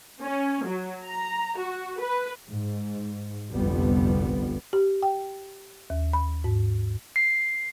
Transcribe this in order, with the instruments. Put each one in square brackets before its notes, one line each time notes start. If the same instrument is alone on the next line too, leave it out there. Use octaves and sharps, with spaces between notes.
[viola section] C#4
F#3
A#5
F#4
B4
[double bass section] G#2
G1 C2 F2 G3 B3
[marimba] G4
G5
D#2
B5
G#2
[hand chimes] C7